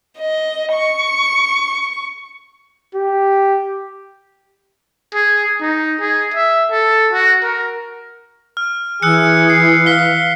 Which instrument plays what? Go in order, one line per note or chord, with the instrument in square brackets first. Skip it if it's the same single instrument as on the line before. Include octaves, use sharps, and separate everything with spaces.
[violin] D#5
C#6
[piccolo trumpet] G4
[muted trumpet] G#4
D#4
G#4
E5
A4
F#4
A#4
[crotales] F6
[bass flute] E3 [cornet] G#4 [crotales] E6 F#6 C#7
[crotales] C7
[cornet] F5 [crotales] B6 G7